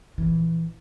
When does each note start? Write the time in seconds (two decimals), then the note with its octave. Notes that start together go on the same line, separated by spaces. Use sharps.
0.18 A#1 E3